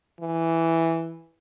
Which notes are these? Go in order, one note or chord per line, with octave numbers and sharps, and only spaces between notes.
E3